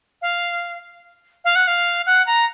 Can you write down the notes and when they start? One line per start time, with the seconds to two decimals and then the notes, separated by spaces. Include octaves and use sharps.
0.22 F5
1.45 F5
1.56 F#5
1.67 F5
2.06 F#5
2.27 A#5